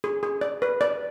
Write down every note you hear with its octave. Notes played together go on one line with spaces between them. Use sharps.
G#4
G#4
D5
B4
D5